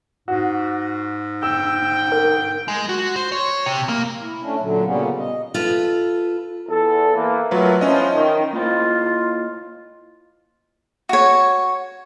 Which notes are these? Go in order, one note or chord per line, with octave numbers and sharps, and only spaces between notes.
G#2 F#4
G5 E6
A#4
G#3
F#4
C5
C#5
C3
A#3
E4
A3 C#4 D4
A#2 D3 F#3
A#2 C#3 G3 A#3 B3 C#4
D#5
F4 A4 B4
E2 A4
E3 A#3
F#3 A3 B3 F4 A#4 B4
E3 F3 C#4 D#5
D#3
A#3 E4 F4 D#5
F#4 C#5